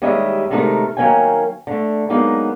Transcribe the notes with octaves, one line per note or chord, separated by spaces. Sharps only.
D#2 G3 G#3 C#4 D#5 E5
C3 D#3 G#3 A3 D#4 A#4
D#3 F#3 A#3 C#4 G5 G#5
D3 A3
F#3 G#3 A#3 B3 D#4